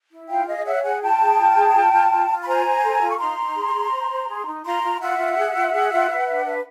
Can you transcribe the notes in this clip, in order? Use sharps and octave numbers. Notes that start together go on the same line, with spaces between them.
E4
F4 F5 G5
G#4 D#5 F5
C#5 E5 F#5
G#4 F#5 G#5
F4 G5 A5
G#4
F4
G#4
F4
F4
F4
F4
B5
C5 G#5 A#5
C5
A4
F4
C#6
D#4 A#5 C6
D#4
G#4
G#4
C5
C5
G#4
D#4
F4 A#5 C6
F4
F4 E5 F#5
F4
G#4
F4
G#4
F4
B4
D4
B4